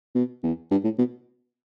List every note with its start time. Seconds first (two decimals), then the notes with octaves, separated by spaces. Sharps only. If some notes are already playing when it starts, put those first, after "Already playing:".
0.15 B2
0.43 E2
0.71 G2
0.84 A2
0.99 B2